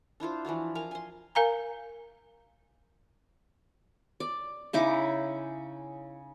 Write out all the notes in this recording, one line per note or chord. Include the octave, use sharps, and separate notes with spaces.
D4 E4 F4 C5
E3 F3 F4 F#4
A#4 F5 G#5 A#5
G#5 C6
A#4 F5 G#5 A#5
D5
C#3 D#4 E4 D6